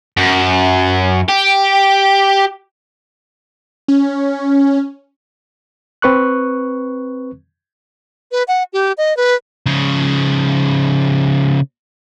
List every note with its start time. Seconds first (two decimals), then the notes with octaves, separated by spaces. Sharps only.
0.17 F#2
1.29 G4
3.88 C#4
6.02 C4 B4 C#6 F#6
8.32 B4
8.48 F#5
8.73 G4
8.98 D#5
9.17 B4
9.66 C#3 F3